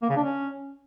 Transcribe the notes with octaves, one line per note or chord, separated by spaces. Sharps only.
A#3
C#3
D4
C#4